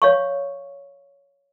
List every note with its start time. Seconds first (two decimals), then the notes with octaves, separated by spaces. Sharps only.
0.02 C#5 F5 C#6